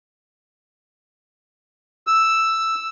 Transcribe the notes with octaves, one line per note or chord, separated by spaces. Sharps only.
E6